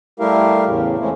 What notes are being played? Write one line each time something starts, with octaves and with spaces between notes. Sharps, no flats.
G3 A3 E4 G4 A#4 F5
E2 A2 C#3
E3 G#3 A3 C4 C#4 E4